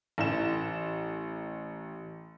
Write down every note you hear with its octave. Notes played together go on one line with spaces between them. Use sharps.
A1 E7